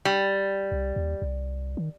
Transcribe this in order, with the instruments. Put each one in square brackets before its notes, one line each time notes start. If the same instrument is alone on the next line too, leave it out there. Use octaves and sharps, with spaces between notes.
[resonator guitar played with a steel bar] G3
[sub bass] C2
D#2
C2
D#3